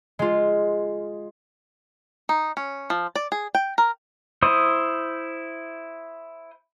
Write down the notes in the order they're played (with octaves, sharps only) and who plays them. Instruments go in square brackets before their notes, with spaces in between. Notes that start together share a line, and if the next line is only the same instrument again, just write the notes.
[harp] G#3 F4
[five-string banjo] D#4
C#4
F3
D5
G#4
G5
A#4
[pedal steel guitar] E4 C5 D#6